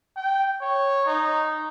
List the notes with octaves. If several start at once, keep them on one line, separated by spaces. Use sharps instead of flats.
G5
C#5
D#4